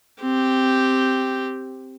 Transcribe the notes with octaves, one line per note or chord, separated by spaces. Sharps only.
C4 G4